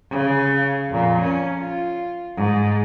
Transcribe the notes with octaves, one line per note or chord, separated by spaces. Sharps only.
C#3
F2 A#2
C#4
F4
G#2